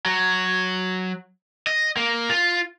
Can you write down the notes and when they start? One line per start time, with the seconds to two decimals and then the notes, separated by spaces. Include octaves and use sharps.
0.06 F#3
1.67 D#5
1.97 A#3
2.30 F4